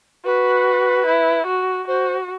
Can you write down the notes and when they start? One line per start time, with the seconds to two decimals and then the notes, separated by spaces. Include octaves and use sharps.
0.24 F#4 B4
1.06 E4
1.46 F#4
1.88 F#4 C5